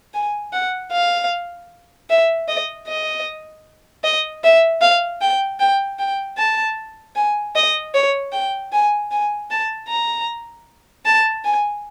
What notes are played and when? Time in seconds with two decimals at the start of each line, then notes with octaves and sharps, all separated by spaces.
0.14 G#5
0.53 F#5
0.92 F5
2.10 E5
2.48 D#5
2.87 D#5
4.04 D#5
4.44 E5
4.81 F5
5.21 G5
5.60 G5
5.99 G5
6.37 A5
7.15 G#5
7.55 D#5
7.94 C#5
8.32 G5
8.72 G#5
9.11 G#5
9.50 A5
9.89 A#5
11.05 A5
11.44 G#5